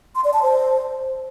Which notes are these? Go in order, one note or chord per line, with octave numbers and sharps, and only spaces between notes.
C6
D5
A5
C5